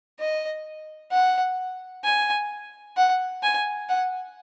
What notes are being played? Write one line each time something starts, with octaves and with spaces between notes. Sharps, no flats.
D#5
F#5
G#5
F#5
G#5
F#5